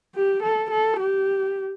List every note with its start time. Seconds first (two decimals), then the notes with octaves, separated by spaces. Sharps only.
0.15 G4
0.43 A4
0.71 A4
1.00 G4